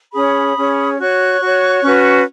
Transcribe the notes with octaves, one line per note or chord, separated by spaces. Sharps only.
C#4 G#4 C#5 B5 D#6
C#4 G#4 C#5
F#4 C#5 C#6 F#6
F#4 C#5
C#4 F#4 B4